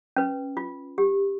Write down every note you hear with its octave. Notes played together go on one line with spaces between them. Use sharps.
C#4 B4
F4
G4